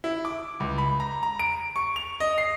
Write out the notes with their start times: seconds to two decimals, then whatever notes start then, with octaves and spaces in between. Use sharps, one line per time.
0.04 E4
0.25 D6
0.60 C#2
0.78 B5
1.00 A#5
1.23 A#5
1.39 D7
1.76 C#6
1.96 F7
2.20 D#5
2.38 C7